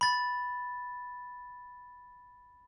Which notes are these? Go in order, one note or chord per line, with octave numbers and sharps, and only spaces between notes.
B5 A6